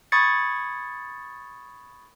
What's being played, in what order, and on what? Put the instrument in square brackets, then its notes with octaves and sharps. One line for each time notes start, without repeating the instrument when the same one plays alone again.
[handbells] B5 C#6 D#6 G#6 A6 C#7